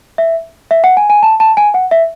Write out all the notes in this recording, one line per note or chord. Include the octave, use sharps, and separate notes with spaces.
E5
E5
F#5
G#5
G#5
A5
A5
G#5
F#5
E5